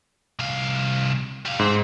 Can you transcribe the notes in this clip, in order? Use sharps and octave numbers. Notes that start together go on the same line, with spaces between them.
C2 F5
G3 F5
G#2 C4